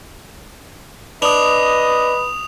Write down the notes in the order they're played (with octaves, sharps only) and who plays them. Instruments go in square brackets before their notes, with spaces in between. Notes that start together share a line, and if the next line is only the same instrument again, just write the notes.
[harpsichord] D4 [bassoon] B4 [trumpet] D#5 [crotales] D#6 F7